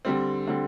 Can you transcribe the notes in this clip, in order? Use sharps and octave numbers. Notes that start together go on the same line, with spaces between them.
D3 G3 C4
D3 G3 C4